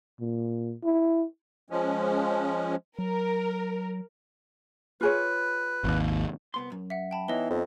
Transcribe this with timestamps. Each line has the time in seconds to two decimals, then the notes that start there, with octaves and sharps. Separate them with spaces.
0.20 A#2
0.84 E4
1.70 F3 G#3 C#4
2.99 F#3 A#4
5.01 F4 G#4 B4 C#5
5.84 G#1 D#2
6.54 C2 B3 C6
6.72 F#2
6.90 E5 F#5
7.11 G5 A5 B5
7.28 E3 B3 D#4 C#5 D#5 G7
7.50 F2